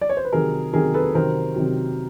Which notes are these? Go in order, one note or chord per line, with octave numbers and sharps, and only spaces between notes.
D5
C#5
C5
B4
C3 D#3 F#3 G#4 A#4
C3 D#3 F#3 G#4 A#4
A4 B4
C3 D#3 F#3 A#4 C5
C3 D#3 F#3